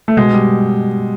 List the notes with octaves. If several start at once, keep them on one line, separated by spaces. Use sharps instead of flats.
A3
B2 G#3
G3